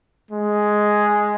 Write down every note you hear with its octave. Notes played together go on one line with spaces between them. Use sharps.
G#3